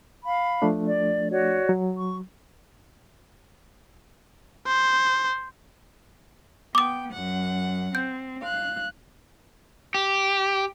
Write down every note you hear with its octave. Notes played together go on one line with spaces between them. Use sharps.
F5 B5
F3 A3 D4
D5
F#4 C#5 D5
F#3
C#6
C5
B3 G5 D6 D#6
F#2 F#5
C4 G6
F5 F#6
G4